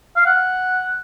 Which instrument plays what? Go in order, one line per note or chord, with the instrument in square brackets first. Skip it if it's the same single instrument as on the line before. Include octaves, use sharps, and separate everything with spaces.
[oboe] F5
F#5